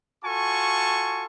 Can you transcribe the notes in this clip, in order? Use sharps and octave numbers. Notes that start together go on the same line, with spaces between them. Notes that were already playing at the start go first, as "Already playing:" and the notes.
F4 F#4 A4 G#5 A5 C#6